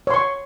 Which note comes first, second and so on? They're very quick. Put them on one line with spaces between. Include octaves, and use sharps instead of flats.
C#5 C6 C#6